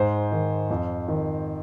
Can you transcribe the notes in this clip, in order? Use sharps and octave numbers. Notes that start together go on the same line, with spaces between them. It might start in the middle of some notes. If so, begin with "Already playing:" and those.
Already playing: G#2 C5
D#3
F2
D#3